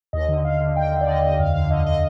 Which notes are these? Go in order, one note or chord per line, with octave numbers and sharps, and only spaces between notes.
D#2 D#5
D3
D3 F5
D3
D3 G5
D3
D5
D3 D#5
D#2 D#5
F2 F5
D3 F5
D3 D#5
D3 D#5